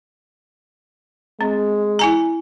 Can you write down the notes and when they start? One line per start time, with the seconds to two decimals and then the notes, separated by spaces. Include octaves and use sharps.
1.41 G#3 C4
1.99 E4 G#5 A#5